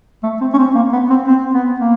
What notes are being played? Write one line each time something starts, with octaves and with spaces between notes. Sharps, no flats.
A3
C4
C#4
C4
A#3
B3
C4
C4
B3
A#3